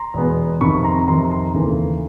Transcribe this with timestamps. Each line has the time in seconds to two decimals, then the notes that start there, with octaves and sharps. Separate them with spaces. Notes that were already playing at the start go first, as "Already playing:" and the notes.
Already playing: A#5 C6
0.14 E2 B2 G#3 B3
0.61 F2 C3 D#3 B5 C#6
0.84 A#5 C6
1.08 F2 C3 D#3 A#5 C6
1.31 A#5 C6
1.54 D#2 C#3 E3 A3